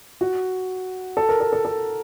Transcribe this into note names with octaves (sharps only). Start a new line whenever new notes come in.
F#4
A4
A#4
A4
A4
A4